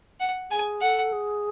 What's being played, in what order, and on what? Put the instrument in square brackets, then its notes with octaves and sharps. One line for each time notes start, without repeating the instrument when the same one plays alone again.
[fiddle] F#5
[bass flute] G#4 [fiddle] G#5
[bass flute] A4 [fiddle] F#5
[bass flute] G#4